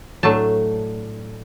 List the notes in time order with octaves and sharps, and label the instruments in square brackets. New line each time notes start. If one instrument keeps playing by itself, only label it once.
[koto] A2 F#3 A3 D4 A5